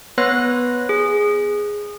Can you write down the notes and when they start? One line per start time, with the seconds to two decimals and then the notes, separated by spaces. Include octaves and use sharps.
0.18 B3 B4 C#5 F#6 A#6
0.89 G#4